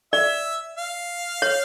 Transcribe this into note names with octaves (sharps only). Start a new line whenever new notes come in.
D5 E5
F5
C#5